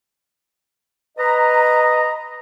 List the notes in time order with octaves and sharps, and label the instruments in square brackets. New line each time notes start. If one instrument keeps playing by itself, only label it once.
[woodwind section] B4 D#5 A#5